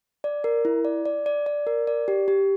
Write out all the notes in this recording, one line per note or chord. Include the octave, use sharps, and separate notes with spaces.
D5
A#4
E4
D5
D5
D5
D5
A#4
D5
G4
G4